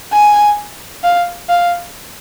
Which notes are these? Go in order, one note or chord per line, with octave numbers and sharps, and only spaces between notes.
G#5
F5
F5